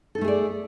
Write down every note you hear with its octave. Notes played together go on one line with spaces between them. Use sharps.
A3 D#4 G#4 A4 D5